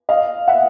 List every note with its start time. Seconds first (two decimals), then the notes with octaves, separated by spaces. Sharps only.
0.09 D#5 F5
0.48 E5 F#5